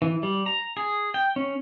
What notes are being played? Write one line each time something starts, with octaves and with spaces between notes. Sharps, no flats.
E3
G3
A#5
G#4
G5
C#4